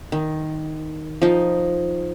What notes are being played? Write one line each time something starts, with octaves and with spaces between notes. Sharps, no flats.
D#3
F3 D#4